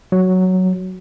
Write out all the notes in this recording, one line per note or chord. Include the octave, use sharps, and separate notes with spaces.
F#3